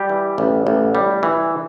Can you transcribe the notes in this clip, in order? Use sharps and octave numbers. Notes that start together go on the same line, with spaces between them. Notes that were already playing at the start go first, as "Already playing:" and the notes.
Already playing: G3 G4
E3
A1
A1
G3
E3